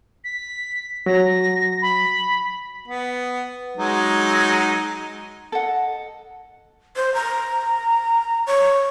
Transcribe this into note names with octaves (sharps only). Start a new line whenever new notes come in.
B6
F#3 A#6
B5
B3
F#3 G#3 D#4
A4 D#5 F#5
C5
A#5
C#5